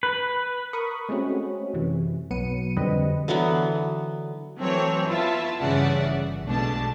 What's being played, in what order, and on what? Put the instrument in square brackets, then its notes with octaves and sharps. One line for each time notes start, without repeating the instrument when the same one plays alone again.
[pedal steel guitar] B4
[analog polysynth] A#4 B5 C#6 D#6
G#3 A3 C4 C#4 F#4
F#2 C3 E3
B1 F#3 B3 C#7 D#7
F2 D3 G3 C4 B4 D#5
[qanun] D3 E3 F#3 B3
[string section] E3 F#3 A3 C4 C#5
B3 E4 F4 E5 A5
G2 C#3 E3 D5 E5 F#5
G1
B1 B2 G#3 A3 D4 A5